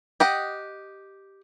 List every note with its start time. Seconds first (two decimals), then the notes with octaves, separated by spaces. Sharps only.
0.20 G4 D#5 F#5